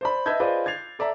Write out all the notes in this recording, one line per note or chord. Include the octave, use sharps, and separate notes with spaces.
C5 D5 B5
B4 D#5 E5 A5 G6 G#6
F4 G#4 B4 C5 D5 D#5
G#6 A6 C7 F7
A4 D5 E5 A#5